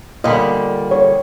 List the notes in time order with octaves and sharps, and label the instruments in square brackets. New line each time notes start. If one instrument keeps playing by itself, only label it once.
[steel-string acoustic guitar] A#2 D3 G3 [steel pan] D#5 B5
[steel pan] C#5